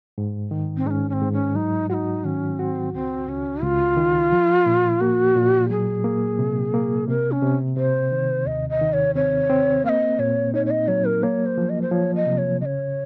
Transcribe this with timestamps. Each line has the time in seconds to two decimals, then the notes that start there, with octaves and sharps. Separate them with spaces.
0.18 G#2
0.51 D#3
0.77 C4
0.86 G#2 D#4
0.90 C#4
1.09 C#4
1.13 C4
1.21 G#2
1.33 C#4
1.55 F#3 D#4
1.90 F4 F#4
1.94 D#4
2.25 D#3 C#4
2.59 C4 F#4
2.93 C#2 C4
3.29 C#2 C#4
3.63 C#2 F4
3.97 D#3
4.32 F3
4.66 A#2
5.01 A#3 F#4
5.36 A#2
5.70 F#3 G#4
6.04 A#3
6.39 C3
6.74 A#3
7.08 C3 A#4
7.32 C#4
7.42 C3
7.77 C3 C5
8.12 D#3
8.46 D#2 D#5
8.69 D#5
8.81 D#3
8.93 C#5
9.15 C4 C#5
9.50 C4
9.84 A#3 F5
9.89 D#5
10.19 A#2 C#5
10.54 D#4 C#5
10.66 C#5
10.71 D#5
10.88 F#3 C#5
11.05 A#4
11.23 A#3 C#5
11.46 C5
11.58 F3
11.69 D#5
11.82 C5
11.91 F3 C#5
12.15 D#5
12.26 C3
12.38 C#5
12.61 C#3 C#5 D#5